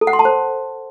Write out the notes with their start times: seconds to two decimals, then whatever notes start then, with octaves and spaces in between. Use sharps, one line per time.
0.01 A4
0.07 F#5
0.13 C6
0.19 A5
0.25 C5